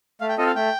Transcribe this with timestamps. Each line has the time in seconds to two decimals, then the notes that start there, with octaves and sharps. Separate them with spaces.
0.21 A3 F5
0.29 G5
0.38 C4 F4 A4 D#5
0.46 F5
0.55 A3 G5